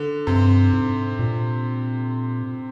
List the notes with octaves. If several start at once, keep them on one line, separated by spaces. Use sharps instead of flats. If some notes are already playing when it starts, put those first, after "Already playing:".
Already playing: D3
G2 C3
G#2
A#2